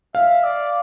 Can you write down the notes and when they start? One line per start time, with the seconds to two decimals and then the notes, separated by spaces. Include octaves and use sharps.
0.15 E5 F5
0.44 D5